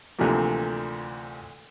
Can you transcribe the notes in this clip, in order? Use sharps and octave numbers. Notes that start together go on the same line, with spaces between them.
D2 C3 E3 F3 A3 A#3